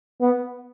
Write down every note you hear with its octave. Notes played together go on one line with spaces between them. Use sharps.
B3